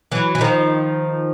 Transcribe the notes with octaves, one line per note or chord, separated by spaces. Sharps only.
E3 F#3
E3
D#3 F3